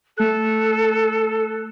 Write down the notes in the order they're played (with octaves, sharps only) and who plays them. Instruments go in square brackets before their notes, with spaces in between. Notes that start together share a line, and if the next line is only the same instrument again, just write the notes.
[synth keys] A3 F#6 [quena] A4